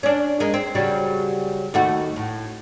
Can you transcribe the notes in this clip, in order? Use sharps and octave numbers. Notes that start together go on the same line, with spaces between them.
C#4 D4
G#3 A#3
C4
C#3 F#3 G3
D#2 A3 F#4
A2